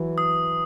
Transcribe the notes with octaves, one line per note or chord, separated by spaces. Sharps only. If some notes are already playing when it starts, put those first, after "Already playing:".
Already playing: E3 F#3
D#6